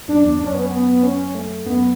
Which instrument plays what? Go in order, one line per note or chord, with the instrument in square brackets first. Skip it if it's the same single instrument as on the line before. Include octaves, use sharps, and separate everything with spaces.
[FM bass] F#2 [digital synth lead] D4
[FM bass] E2
[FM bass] F#2 [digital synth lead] D4
[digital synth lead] C#4
B3
C#4
B3
C#4
A3
[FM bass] F#2 [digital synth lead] B3